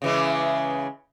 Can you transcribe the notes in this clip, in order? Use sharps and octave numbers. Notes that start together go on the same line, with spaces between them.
C#3 E3 G#3